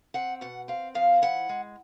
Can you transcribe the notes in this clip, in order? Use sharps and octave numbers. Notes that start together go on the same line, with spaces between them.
C4 F#5
B2 F#5
C4 F5
F3 F5
E4 F#5
G#3